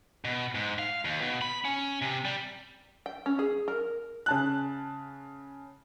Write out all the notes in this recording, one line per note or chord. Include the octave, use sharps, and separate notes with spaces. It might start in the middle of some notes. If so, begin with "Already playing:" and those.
B2
G#2
F5
D#2
B2
B5
C#4
C3
G3
G5
C#4
G#4
A#4
C#3 A5 F#6